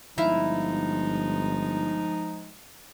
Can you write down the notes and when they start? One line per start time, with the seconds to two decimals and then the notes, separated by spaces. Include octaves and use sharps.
0.18 G1 F3 G#3 D#4 E4 E5 F5